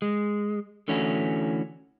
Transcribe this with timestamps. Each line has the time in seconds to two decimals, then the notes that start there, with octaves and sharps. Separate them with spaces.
0.02 G#3
0.88 D3 E3 A3 C#4 E4 F#4